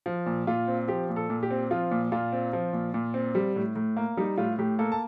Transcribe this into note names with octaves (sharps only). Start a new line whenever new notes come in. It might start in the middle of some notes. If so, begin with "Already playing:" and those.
F3
A#2
A#2 F4
C4
F3 G4
A#2
A4
A#2
G4
C4
F3 F4
A#2
A#2 F4
C4
F3
A#2
A#2
C4
G3
A2
A2
A#3
G3 D#4
A2 F4
A2 G4
A#3 A4
A5